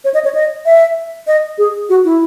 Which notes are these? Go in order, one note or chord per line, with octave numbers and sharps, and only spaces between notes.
C#5
D#5
C#5
D#5
E5
D#5
G#4
F#4
E4